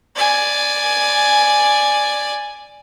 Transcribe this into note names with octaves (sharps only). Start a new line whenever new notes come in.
D5 G#5